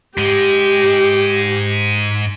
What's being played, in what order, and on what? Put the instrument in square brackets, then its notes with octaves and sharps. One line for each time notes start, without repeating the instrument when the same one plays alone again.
[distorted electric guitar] G#2 G#3 [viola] G4